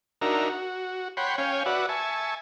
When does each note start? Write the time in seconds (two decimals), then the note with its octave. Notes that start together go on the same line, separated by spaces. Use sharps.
0.21 D4 D#4 F#4 A#4 E5 A#5
0.49 F#4
1.17 C#5 F#5 G5 B5 C6
1.38 C#4 C#5 F5 G5 G#5
1.66 F#4 B4 D5 E5 F#5
1.89 E5 G#5 A5 C#6